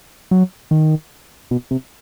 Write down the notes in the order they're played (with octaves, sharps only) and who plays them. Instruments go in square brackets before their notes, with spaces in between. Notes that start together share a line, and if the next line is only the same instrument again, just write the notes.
[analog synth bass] F#3
D#3
B2
C3